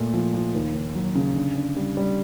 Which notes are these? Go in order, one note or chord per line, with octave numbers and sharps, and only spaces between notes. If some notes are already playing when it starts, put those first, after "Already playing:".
Already playing: A#2 A3
F3
F3
D#2
D#2
F#3
C#3
D3
D3
G3
G3